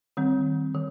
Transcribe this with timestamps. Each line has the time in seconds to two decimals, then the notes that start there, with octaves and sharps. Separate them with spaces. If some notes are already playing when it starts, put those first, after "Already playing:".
0.17 D#3 G3 C4
0.75 D#3